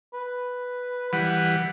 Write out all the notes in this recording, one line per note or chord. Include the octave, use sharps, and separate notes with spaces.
B4
E3 G3 B4 F#5